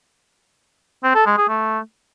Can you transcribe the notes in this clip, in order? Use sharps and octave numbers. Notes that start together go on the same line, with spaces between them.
C4
A4
G#3
G#4
A3